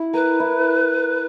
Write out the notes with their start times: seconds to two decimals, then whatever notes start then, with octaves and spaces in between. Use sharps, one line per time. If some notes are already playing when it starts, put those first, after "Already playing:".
Already playing: E4
0.14 A#4 B4
0.40 E4